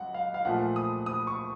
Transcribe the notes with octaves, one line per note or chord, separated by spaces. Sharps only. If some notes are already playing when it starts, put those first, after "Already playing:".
Already playing: C#2 F#3 F#5
F5
F5
A#2 F3 A3 F#5
D#6
D#6
C#6